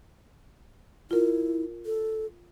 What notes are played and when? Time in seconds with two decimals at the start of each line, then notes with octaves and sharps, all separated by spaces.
1.11 E4 F4 A#4
1.86 A4